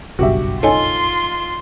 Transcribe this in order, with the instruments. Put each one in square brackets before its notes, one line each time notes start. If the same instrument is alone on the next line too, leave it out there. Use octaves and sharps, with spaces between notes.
[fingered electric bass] F#1 B1 G2 [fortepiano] F#4 G4 E5
[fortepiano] D#4 A4 [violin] F4 C6 [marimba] C#5 D#5 G#5